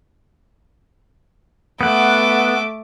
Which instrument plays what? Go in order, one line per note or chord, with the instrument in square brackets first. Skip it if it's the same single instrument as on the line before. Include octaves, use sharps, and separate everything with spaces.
[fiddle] A3 D6 [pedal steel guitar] B3 F#5